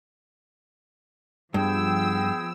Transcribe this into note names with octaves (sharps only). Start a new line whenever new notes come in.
G2 F3 B3 G#4 G5 E6